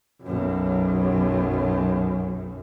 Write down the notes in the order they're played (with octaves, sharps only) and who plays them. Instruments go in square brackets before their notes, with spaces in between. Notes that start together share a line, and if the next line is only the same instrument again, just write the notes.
[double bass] B1 F#2